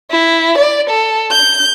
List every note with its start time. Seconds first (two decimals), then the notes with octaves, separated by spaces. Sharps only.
0.11 E4
0.58 D5
0.90 A4
1.32 G6